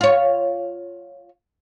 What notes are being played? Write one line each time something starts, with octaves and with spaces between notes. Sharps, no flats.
F4 C#5